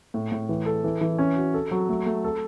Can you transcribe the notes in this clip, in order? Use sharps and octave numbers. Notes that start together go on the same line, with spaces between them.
A2
A2
E3
A4
E3
E3
C#4
F#4
A4
F#3
A3
A3
A4